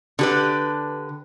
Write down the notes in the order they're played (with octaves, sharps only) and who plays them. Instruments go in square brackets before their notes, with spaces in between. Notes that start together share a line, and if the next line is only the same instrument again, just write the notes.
[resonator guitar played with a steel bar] D3 G4 B4